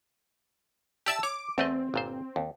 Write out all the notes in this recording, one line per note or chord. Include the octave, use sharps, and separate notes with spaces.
G4 D5 E5 A5 E6
C#5 D6
E2 A3 C4 D#5
G1 A#2 C5
D#2